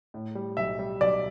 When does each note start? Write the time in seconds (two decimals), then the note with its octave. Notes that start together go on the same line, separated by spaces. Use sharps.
0.14 A2
0.35 G3
0.57 B1 E5
0.79 G3
1.01 B1 D5